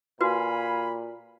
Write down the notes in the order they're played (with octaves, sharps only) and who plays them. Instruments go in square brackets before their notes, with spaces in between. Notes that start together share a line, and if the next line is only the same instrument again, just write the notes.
[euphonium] A#2 [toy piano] F#4 B4 [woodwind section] F5 G#5 B5